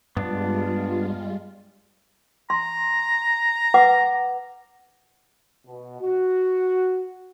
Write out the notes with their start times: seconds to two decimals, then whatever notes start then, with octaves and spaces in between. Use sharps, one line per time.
0.17 G2 G3 G#3 B3 D4 F4
2.50 A#5 C6
3.74 B4 F#5 D6
5.67 B2
6.01 F#4